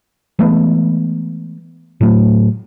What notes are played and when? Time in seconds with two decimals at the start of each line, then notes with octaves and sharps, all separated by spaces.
0.39 E3 G#3 A3 B3
2.01 A2 F#3 A3